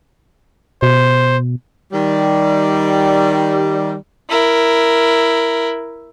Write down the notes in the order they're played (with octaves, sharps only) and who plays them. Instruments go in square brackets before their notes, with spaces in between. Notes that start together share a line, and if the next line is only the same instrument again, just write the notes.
[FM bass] B2 [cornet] C5
[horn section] D#3 G3
[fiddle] E4 A#4